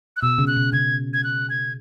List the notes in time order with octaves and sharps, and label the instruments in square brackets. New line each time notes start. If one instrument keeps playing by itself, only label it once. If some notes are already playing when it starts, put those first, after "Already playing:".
[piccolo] F#6
[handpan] B2 [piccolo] E6
[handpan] C#3
[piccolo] F#6
[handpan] B2
[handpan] C#3 [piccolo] G#6
[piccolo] G#6
F#6
G#6